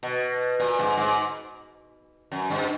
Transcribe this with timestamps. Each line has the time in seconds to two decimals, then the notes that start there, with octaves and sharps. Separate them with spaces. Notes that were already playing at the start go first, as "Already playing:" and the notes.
0.03 B2
0.60 A#2
0.79 G#2
0.97 G#2
2.32 F#2
2.50 G2